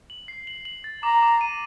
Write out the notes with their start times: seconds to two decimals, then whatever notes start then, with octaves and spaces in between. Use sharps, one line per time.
0.10 F#7
0.28 C7
0.47 F#7
0.65 F#7
0.84 A6
1.03 A#5 D6
1.23 D6
1.41 D#7